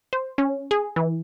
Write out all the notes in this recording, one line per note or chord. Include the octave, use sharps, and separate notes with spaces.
C5
C#4
G#4
E3